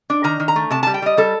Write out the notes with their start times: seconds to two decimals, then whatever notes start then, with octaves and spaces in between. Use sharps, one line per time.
0.10 D4
0.24 D#3 A#5
0.40 D#3
0.48 A#5
0.56 A3
0.70 C3 A5
0.83 G3 A5
0.94 G5
1.02 G3 D#5
1.17 G3 A4